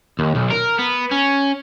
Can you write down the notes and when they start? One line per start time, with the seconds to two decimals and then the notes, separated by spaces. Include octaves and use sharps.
0.19 D#2
0.36 B1
0.52 A#4
0.79 B3
1.11 C#4